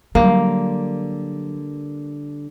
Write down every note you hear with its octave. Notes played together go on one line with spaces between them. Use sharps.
D3 F#3 G3 A#3